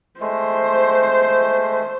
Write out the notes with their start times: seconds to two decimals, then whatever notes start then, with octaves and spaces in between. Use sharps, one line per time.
0.20 G#3 A3 C5